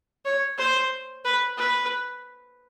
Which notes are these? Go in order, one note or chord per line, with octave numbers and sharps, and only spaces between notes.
C#5
C5
B4
B4